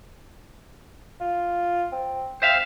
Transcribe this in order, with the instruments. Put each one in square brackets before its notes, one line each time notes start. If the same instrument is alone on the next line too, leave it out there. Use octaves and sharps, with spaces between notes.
[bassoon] F4
C4
[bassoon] C4 [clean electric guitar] C5 E5 F5